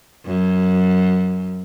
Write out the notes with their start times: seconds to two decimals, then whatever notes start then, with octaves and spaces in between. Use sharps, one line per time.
0.26 F#2